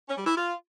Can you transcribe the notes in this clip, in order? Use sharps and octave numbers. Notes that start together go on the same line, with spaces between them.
C#4
G3
E4
F4